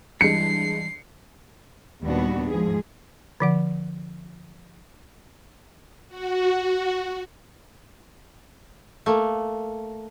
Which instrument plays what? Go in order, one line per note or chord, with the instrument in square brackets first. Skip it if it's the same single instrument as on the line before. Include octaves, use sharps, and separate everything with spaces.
[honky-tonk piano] G2 G#3 [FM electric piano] E3 G3 [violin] C7 [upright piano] C#7
[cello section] D#2 A#2 G3 B3 D4 F#4
G#2 F3 G#4
[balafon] D3 F3 F#5
[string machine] F#4
[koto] A3 A#3